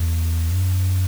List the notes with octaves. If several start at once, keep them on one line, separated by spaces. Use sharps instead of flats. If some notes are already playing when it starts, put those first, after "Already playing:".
Already playing: E2
F#2